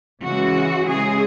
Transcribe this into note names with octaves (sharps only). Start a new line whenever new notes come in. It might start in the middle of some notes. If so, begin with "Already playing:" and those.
C#3 E3 G#3 F#4
C#3 E3 G#3 G#4